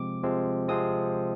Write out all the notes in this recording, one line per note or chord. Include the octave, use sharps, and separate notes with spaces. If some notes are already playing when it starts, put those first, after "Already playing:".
Already playing: C3 F3 G#3 C4 D6
C3 F3 G#3 C4
C3 F3 G#3 C4 D#6